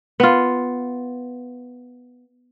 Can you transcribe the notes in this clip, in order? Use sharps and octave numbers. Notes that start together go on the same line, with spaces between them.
B3 F4